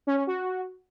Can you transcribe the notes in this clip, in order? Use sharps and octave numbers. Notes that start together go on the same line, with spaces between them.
C#4
C#4
F#4